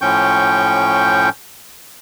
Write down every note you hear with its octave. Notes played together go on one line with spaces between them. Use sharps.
A2 F3 C#4 G5 C#6 G6